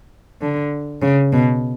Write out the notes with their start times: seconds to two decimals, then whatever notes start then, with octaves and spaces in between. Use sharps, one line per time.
0.41 D3
1.02 C#3
1.33 B2